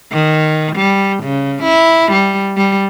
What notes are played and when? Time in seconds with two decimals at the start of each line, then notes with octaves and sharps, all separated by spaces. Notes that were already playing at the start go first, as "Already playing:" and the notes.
0.12 D#3
0.76 G3
1.23 C#3
1.63 E4
2.12 G3
2.57 G3